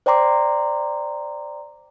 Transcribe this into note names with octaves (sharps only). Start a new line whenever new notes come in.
C5 D5 G5 A#5 C6 D6